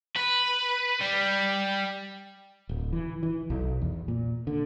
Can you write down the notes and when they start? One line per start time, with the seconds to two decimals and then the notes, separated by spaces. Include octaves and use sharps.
0.16 B4
1.01 G3
2.69 D1
2.93 E3
3.23 E3
3.50 B1
3.82 E2
4.08 A#2
4.47 D3